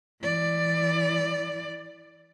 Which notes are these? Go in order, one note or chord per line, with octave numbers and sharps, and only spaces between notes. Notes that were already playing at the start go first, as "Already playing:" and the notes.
E3 D5